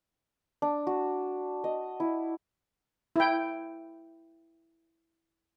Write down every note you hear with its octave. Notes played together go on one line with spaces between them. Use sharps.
D4
F#4
D#5
E4
E4 G5